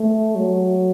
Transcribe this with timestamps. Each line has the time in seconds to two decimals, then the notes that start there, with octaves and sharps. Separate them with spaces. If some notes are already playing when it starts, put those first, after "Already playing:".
Already playing: A3
0.35 F#3